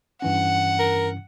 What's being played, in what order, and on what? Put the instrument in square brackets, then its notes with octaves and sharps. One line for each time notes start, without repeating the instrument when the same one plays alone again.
[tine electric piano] G2 E3 C#4 [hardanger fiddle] F#5
[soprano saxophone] A#4